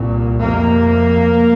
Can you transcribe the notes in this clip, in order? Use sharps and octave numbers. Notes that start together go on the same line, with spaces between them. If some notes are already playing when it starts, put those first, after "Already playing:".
Already playing: C2 A#2
F2 C3 A#3